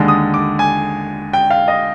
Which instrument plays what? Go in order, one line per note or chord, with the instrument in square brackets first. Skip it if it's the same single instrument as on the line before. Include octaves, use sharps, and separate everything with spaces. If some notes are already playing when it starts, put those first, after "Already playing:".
Already playing: [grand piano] D#2 D3 G#3
D#6
D6
G#5
G5
F5
D#5